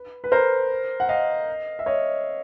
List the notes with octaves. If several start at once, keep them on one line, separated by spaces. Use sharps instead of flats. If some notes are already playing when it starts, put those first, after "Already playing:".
Already playing: B4
B4
A#4 C5
F#5
D#5 F5
E5
C#5 D#5